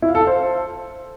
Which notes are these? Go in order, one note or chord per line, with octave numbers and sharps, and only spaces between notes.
E4
F5
A4
F5
C5